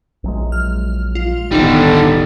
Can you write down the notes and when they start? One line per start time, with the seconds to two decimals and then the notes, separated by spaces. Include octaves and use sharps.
0.24 A#1 F#3 G#3
0.52 F6
1.15 F4
1.52 D1 A1 B2 D3 D#3 G3 D#4 A4